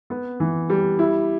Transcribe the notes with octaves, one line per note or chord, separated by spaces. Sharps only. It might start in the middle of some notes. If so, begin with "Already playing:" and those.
B3
E3
G3
E4